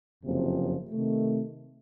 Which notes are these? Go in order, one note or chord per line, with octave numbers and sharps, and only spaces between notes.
F#1 F2 C3 F3
C3 D#3 A3